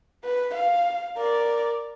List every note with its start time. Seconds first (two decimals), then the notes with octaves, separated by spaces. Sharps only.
0.25 B4
0.55 F5
1.17 A#4 D5